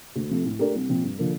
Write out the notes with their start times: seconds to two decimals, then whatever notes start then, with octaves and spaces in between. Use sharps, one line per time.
0.16 D2
0.30 C3 F3 A3
0.45 A2
0.59 A3 D4 G4 A#4
0.75 C2
0.89 A#2 F3 C4
1.03 G2
1.19 D3 F3 A#3